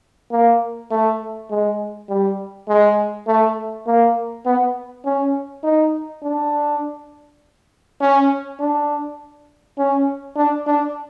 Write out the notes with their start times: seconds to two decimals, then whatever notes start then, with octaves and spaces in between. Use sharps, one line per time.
0.32 A#3
0.91 A3
1.50 G#3
2.09 G3
2.68 G#3
3.27 A3
3.87 A#3
4.46 B3
5.05 C#4
5.64 D#4
6.23 D4
8.01 C#4
8.60 D4
9.78 C#4
10.36 D4
10.67 D4